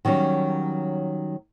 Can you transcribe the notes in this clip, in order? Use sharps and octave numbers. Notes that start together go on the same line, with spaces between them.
D#3 F#3 G3 C#4